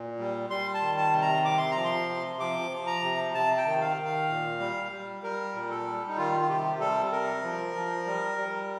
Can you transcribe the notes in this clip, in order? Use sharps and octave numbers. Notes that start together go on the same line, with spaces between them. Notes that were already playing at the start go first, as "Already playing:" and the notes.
Already playing: A#2
G3
G3 C6
A5
D#3
A5
C3
A#5
C3 D6
C6
F3 A#5
C6
C3
F3 D6
F3
A#5
C3
C3 A5
G5
D#3
F5
D#3
F5
A#2
G3
G3
G3 A#4
A#2
A4
G3
D#4
D#3 F4
F4
C3 G4
G3 A4
C3 A#4
F3
F3
G3
G3